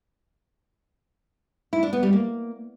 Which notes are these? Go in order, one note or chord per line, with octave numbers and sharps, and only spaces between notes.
E4
D4
B3
G3
A#3